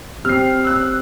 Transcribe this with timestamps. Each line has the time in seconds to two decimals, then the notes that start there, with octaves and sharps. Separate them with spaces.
0.25 C4 G4 F6 C7
0.64 E6 F#6